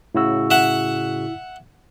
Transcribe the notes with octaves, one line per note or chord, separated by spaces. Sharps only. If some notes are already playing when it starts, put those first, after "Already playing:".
A2 C#3 E4 F#4 E6
E5 F#5